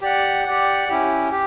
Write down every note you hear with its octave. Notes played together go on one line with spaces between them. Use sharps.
G4 D5 F#5
G4 D5 F#5
C#4 E4 G4
G4